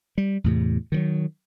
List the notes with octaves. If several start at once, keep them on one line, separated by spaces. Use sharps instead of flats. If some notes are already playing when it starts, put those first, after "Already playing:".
G3
E2 A2 C3
D#3 F3 F#3